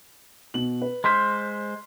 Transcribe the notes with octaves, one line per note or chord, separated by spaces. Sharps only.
B2 F#7
B4
G#3 C5 C6 F6 B6